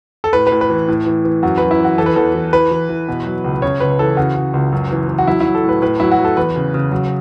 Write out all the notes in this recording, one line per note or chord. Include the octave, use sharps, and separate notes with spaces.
A4
A2 B4
B4
A2
B4
E3
A2
E3
E3
F#2 F#4
F#2 B4
E4
E3 F#4
E3 A4
B4
E2 A4
E3
E3 B4
E3
E3
B2
F#3
C#2
C#3 C#5
C#2 B4
E3 A4
C#3 F#4
C#3
C#2
F#2
E3
E3
F#4
F#3 E4
E4
F#3
A4
A2 B4
A2 B4
F#3 E4
F#4
F#3
A4
E2 B4
C#3
C#3
F#3